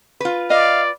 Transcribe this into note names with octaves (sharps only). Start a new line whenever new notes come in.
F4 B4
D5 D#5 F5